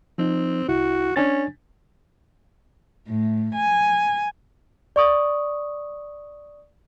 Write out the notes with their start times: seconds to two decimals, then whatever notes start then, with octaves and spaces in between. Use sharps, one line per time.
0.18 F3 C4 D#4
0.69 C2 E4 F#4
1.16 C#4 D4 G#5 A6
3.07 A2
3.55 G#5
4.96 D5 C#6 D#6